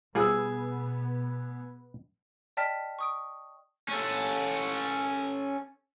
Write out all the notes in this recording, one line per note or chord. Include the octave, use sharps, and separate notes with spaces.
B2 G3 B3 F4 G#4 F#5 D#6 E6
D5 D#5 G5 A5 F6 B6
C#6 D#6 D7
C#4 A4